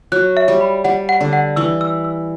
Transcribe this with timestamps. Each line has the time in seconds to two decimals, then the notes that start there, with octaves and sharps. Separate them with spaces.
0.12 F#3 F#6
0.37 E5
0.48 G3
0.61 B5
0.84 G3 F#5
1.09 F#5
1.21 D3
1.33 F#5
1.56 E3 E6
1.81 E6
2.04 E6